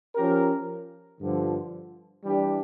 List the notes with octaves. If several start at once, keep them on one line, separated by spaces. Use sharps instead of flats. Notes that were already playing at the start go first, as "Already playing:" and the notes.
F3 C#4 G4 A#4
G2 D3 F3
E3 G3 D4 G4